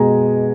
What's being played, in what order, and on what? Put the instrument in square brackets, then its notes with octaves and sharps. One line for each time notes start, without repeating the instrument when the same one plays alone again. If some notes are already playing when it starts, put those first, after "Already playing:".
Already playing: [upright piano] B2 G#3 G#5 A#5